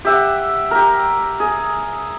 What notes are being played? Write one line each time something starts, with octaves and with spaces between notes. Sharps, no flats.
G4 E5 F#5
G4 A#4
G#4